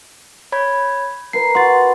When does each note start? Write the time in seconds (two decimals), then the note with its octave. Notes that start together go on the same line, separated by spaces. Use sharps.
0.52 C#5 B5 G#6
1.33 A#4 B4 C7
1.55 F#4 C6 A6